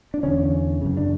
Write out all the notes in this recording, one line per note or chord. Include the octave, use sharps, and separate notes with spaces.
D4
E2 D3 C#4
F#2 C#3
D4